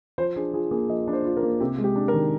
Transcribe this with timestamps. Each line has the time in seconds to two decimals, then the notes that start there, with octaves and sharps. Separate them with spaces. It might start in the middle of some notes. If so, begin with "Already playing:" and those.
0.18 F3 C5
0.36 D4 G#4
0.54 F4 G#4
0.71 A#3 G#4
0.89 F3 D#5
1.08 D4
1.13 C5
1.25 F4
1.37 A#4
1.43 A#3
1.60 C3 G4
1.78 G#3
1.84 G4
1.96 D4
2.08 A#4
2.14 D#3